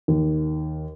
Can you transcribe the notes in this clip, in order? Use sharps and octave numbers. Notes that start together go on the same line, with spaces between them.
D#2